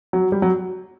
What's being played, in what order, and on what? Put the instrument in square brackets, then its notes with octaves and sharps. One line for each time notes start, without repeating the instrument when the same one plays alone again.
[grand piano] F#3
G3
F#3